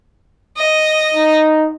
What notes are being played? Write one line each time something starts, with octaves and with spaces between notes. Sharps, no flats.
D#5
D#4